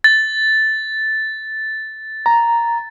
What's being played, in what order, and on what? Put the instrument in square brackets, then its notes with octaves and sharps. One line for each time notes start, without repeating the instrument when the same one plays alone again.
[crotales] A6
[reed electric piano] A#5